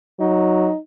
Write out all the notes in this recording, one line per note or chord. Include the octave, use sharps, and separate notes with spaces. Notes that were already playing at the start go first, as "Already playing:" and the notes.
F#3 D#4